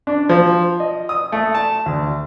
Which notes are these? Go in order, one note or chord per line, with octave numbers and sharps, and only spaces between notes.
D4
F3
D#5
D#6
A3
A5
D2